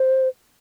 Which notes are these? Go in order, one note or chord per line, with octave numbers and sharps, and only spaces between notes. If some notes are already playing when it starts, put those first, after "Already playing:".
Already playing: C5